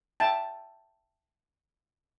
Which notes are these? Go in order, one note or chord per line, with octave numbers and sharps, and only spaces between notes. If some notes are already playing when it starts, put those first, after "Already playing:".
E5 G5 A5